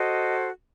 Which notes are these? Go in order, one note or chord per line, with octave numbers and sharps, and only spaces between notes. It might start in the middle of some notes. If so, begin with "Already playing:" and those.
Already playing: F#4 A4 C5 D#5